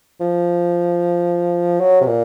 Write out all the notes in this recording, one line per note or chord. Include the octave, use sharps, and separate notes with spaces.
F3
F#3
C3
A#2